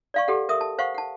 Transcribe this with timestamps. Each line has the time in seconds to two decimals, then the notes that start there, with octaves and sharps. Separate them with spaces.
0.14 D5 F5 C#6
0.28 G4 A4 F#5
0.49 A#4 E5 D#6
0.61 A5
0.79 C5 F5 F#5 C#6
0.94 F#5 A5